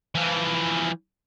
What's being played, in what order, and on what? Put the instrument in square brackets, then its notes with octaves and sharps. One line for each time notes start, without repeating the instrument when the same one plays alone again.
[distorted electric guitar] E3 F3